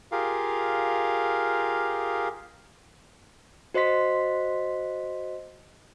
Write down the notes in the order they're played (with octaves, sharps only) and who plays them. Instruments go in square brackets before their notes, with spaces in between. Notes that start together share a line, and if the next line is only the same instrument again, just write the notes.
[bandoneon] F4 G4 G#4 A#4 F5
[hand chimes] F#4 C5 D#5 C6 B6